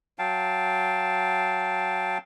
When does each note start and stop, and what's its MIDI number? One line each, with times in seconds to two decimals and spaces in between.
0.19 2.18 54
0.19 2.18 77
0.19 2.18 79
0.19 2.18 81